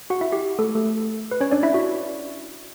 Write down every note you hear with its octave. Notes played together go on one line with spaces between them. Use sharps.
F#4 F#5
E4 E5
G4
A3 A4
A3 A4
B4
C#4 C#5
D4 D5
E4 E5
F#4